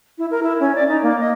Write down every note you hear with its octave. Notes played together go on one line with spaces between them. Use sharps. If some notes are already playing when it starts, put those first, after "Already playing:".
E4
A#4
E4
C#4
D5
D#4
A#3
D#5